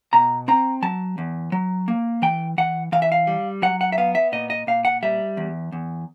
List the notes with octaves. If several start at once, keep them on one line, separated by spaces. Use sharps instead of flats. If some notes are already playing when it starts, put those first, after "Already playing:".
B2 A#5
C4 A#5
F#3 A5
E2
F#3
A#3
E3 G5
E3 F#5
E3 F5
E5
F5
G3
F#3 F#5
F#5
E5
B3 F5
E5
A#2 D#5
D#5
A#2 F5
F#5
G3 E5
E2
E2